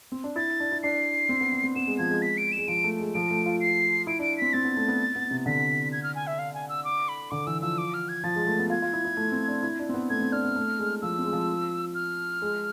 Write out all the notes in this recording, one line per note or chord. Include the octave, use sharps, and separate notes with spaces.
C4
D4
E4 A6
D4
E4
D4 C7
C4
B3
C4
C4
B3 E7
G#3
F3 G#6
G#3
B6
D7
E7
G#3
F3 D7
A3
G#3
F3 D7
A3
F4
C7
E4 D7
D4 D7
C4 B6
C4 A6
B3
A3
B3
B3
C3
D3 B6
G#6
F6
G#5
E5
F5
G#5
E6
D6
B5
D3 D6
E3 E6
F3 E6
D6
F6
G#6
F3 A6
G#3
A3
B3
F4 G#6
F4
E4
E4
A3
C4
D4
E4
D4
C4
B3
A3 G#6
C4
D4 F6
B3
A3
G#3
F3 E6
C4
G#3
F3
F6
G#3